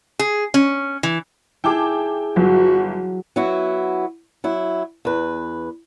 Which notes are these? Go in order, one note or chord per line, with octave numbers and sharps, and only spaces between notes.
G#4
C#4
E3
E4 G#4 G5 A5 D6
G1 F#3 F#4
F#3 B3 E4 F#4
F#3 E4
E2 B4